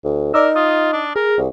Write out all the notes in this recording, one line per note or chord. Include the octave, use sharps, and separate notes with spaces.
D2
D#4 A#4 D5 D6 E6
F4 D#6
D4
G#4 A#4
C2